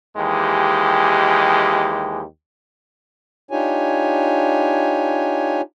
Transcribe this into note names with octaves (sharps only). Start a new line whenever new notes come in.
D#2 E3 G#3 G4
D4 D#4 F4 G4 C#5 G#5